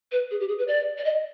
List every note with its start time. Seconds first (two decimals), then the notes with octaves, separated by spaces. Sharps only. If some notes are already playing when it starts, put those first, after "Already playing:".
0.12 B4
0.31 G#4
0.40 G4
0.49 G#4
0.59 B4
0.68 D5
0.98 D5
1.05 D#5